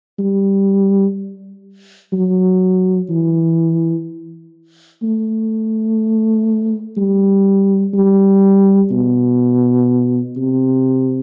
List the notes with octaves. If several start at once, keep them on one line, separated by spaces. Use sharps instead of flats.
G3
F#3
E3
A3
G3
G3
B2
C3